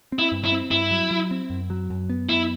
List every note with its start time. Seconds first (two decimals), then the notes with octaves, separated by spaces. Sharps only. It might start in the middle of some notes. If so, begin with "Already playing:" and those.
0.12 C4
0.19 E4
0.32 G2
0.45 E4
0.52 C4
0.71 G2 E4
0.91 F#3
1.11 F#3
1.31 C4
1.50 F#2
1.70 F#3
1.90 F#2
2.10 B3
2.29 F#2 E4